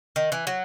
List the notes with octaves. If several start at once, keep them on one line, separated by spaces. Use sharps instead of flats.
D#3
E3
F#3